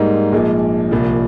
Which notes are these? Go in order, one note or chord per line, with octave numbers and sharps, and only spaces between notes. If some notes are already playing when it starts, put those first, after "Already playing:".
Already playing: G#2 G3 A#3 D#4
A#1 A#2 F3 G#3
C2 A#2 F3